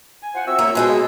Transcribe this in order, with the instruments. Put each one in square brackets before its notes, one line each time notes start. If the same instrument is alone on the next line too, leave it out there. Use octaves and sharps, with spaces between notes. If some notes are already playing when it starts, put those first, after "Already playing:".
[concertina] G#5
[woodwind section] F4 C5 F#5
[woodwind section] C4 F#4 [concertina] E5 E6
[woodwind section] C2 F4 C#5 [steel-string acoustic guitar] A#3
[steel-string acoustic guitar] B2 G#3 G5 [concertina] B4 G#5 [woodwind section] C6 E6
[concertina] A#3 A5 [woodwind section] G#4